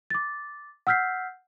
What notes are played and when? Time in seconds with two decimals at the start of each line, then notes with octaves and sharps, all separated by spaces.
0.10 D6 A6
0.87 F#5 E6 F6 G6 B6 C7